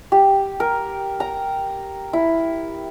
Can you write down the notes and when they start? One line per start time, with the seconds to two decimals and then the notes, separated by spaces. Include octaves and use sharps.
0.12 G4
0.60 A#4
1.20 A#5
2.13 E4